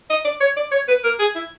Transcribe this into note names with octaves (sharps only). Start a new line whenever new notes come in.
D#5
D5
C#5
D5
C#5
B4
A#4
G#4
E4